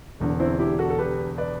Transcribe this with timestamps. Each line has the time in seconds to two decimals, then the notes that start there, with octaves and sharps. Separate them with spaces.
0.20 E1 E2 D3
0.40 C4 E4
0.59 E4 G4
0.79 F#4 A4
0.90 A4
0.99 G4 B4
1.38 B4 D5